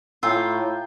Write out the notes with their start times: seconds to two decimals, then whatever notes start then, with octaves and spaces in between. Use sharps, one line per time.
0.23 A2 F4 G5 G#5 A#5 E6